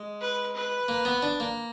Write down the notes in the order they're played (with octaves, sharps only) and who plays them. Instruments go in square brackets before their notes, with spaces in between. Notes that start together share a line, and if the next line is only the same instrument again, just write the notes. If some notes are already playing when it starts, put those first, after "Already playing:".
Already playing: [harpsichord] G#3
[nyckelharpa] B4
B4
[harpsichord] A#3
B3
D4
A#3